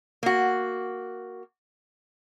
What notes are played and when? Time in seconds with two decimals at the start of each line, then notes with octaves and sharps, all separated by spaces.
0.23 A#3 F#4